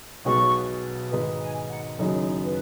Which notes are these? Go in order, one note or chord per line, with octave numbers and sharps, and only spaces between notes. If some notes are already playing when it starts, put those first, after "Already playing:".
B1 B2 G#3 B3 F#4 C#6
G#2 D#3 G#3 D#4 B4
G#5
F#5
F#1 F#2 D#3 F#3 D#4 G#4
B4